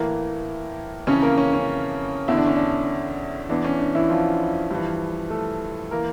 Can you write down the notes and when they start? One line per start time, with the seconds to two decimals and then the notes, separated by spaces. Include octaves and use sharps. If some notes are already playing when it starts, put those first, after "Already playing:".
Already playing: A2 E3 A#3 A#4
1.07 F2 C#3 E3 C#4 C#5
1.22 A#3 A#4
1.38 C#4
1.53 C#4
2.28 E2 D3 E4
2.37 D4
2.46 C#4
2.56 D4
3.49 E2 E3 D4
3.64 C#4
3.79 D4
3.95 E3 E4
4.10 F3 F4
4.71 G2 E3
5.30 A3 A4
5.91 E3 A#3 A#4